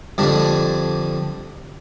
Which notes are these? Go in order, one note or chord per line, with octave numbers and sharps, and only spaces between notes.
F2 D3 G3 D4